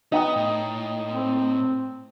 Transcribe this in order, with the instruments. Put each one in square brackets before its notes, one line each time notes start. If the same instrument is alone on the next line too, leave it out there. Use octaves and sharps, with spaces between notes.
[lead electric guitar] B3 [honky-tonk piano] D#4 G5 D#6
[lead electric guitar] A2
[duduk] C4